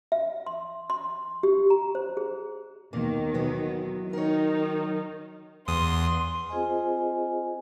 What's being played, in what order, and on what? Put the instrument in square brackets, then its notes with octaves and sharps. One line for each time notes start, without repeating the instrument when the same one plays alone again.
[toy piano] E5
C6
C6
G4
A#5
C5
G#4
[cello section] D#2 D#3 [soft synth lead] B2 [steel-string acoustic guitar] A#3
[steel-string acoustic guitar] E3 B3 F#4 [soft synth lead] F#3
[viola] D#3 [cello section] D#4 [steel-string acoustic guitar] A#4 C#5
[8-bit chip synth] E2 D#6 [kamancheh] C6
[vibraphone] C4 F4 G#4 C5 D#5 G#5